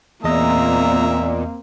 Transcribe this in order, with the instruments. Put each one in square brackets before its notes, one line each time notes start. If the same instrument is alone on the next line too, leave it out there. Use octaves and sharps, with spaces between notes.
[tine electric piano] E2 D#5 [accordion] A#2 [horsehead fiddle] A#3 C4 [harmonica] E5 A#5